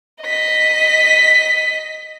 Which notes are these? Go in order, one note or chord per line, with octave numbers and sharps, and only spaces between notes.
D#5 B6